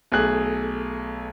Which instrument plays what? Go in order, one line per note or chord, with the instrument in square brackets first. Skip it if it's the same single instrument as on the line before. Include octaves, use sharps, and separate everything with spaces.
[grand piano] B1 A3 G#4 F#6 F#7